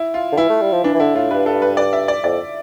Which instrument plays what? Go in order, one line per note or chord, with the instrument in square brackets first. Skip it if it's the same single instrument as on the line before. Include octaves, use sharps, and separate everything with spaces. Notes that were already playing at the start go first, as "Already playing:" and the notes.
Already playing: [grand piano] E4
F4
[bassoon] D3
[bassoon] E3 [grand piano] E4
[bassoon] A3
G3
F3
[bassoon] E3 [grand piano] D4
[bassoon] E3
[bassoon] D3 [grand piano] E4
[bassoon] A2 [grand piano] F4
[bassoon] G2 [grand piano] B4
[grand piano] A4
B4
D5
E5
D5
[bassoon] F2 [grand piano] D5